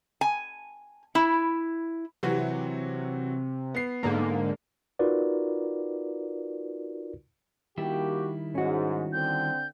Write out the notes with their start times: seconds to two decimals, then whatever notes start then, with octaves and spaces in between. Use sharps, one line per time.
0.21 G#5
1.15 E4
2.23 C3 E3 F#3 F#4
3.75 B3 C7
4.03 G#2 D3 A#3
4.99 D#4 F4 F#4 A#4 B4 D5
7.77 D#3 G3 A#3 E4 F#4 G4
8.55 G#2 C#4 F#4
9.13 D3 C4 G6